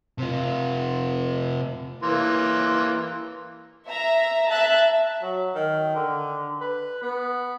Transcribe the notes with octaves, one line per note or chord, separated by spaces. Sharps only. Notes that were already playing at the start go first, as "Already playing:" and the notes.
C3 F4
E3 A#3 C6
E5 A#5
E5 A5 F#6
F#3
D#3
D3
B4
B3